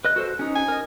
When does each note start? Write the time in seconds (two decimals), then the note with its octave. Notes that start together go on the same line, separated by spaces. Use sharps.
0.05 B4 D#5 F#6
0.16 F#4 A4 C5
0.39 C#4 D#4
0.55 G#5
0.68 A#4 D#5